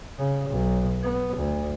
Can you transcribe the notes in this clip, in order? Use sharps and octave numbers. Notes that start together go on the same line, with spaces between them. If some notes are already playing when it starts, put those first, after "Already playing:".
C#3
B1
B3
D2